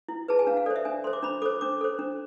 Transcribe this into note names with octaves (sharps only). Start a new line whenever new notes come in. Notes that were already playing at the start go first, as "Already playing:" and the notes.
E4
G#4 B4 A5
G#5
D4 F5
F5
A4 C5 D5
E5
D4 G#5
A4 C5 C6
D6
D4 B5
A4 C5 D6
D4 D6
A4 C5
D4